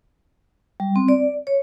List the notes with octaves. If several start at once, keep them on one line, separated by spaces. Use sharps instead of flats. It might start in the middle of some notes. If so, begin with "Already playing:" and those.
G3
C4
D5
C#5